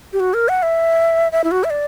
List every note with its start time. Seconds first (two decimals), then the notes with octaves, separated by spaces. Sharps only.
0.13 G4
0.20 F#4
0.34 A#4
0.49 F#5
0.63 E5
1.32 E5
1.44 E4
1.51 F#4
1.64 E5
1.70 D5